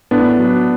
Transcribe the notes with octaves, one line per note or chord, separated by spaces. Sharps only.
A2 B3 D4
F#3